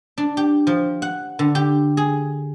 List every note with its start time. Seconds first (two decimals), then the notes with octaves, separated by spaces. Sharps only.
0.18 D4
0.37 G4
0.67 F3
1.02 F#5
1.39 D3
1.55 G4
1.97 G#4